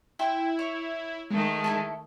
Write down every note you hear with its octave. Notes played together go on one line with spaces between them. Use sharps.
E4 G5 C6
C#5
D#3 G#3 A3
E4 F#4 A4